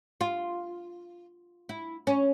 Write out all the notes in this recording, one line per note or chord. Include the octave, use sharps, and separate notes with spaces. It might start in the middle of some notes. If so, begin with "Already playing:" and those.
F4
E4
C#4